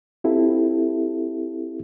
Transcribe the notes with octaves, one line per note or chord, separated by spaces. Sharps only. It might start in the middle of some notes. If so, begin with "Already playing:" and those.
C4 E4 F4 G4 A4